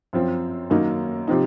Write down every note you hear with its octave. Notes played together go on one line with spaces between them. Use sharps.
F#2 F3 C4
F#2 D#3 F#3 A#3 D#4
C3 F3 C4 D#4